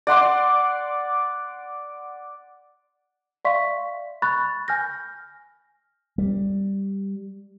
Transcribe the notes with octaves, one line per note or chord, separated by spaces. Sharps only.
D5 F#5 C6 D6
D5 E5 F5 C6 C#6 B6
B5 C#6 F#6 A6
G#5 F6 G6 A#6
G3